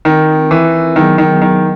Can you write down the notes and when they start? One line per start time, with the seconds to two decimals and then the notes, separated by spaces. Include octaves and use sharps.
0.05 D#3 C4 F4 A#4
0.51 E3
0.96 D#3 F#3 B3 D#4 G#4
1.18 D#3
1.42 D#3